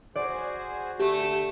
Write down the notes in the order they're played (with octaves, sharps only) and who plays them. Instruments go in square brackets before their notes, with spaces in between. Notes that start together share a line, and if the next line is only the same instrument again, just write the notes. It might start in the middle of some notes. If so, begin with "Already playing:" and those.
[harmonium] F#4 G#4 C5 [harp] D5
[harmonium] D3 [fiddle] A3 [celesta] G4